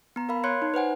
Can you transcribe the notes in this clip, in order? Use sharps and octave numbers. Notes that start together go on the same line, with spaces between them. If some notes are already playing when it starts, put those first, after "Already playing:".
B3 A#5
A#4 F5 B5
C#5 C6 F#6 G#6 C#7
D#4
B4 C5 F#5 G#5